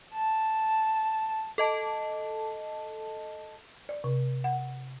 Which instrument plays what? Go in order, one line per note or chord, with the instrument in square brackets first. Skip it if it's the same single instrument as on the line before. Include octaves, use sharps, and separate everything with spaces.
[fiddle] A5
[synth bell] A4 D#5 A5
[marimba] D5
C3
F#5